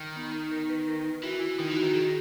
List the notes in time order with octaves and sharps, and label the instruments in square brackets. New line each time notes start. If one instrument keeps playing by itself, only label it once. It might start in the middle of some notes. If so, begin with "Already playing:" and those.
Already playing: [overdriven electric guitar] D#3
[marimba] B3
A#4
B4
A#4
[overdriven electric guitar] E3 [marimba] F#4
[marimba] E4
[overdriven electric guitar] D#3 [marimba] D#4
[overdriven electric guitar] E3
[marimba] F#4
[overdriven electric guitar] D#3
[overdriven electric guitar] D#3 [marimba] G#4